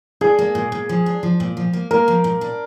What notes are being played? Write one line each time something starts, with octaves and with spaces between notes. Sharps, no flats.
D4 G#4
A#3
A#2
A#2
F3
D4
F3
A#2
F3
A#3
A#3 A#4
F3
A#2
D4